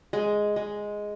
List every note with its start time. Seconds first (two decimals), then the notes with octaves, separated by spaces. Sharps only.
0.13 G#3
0.56 G#3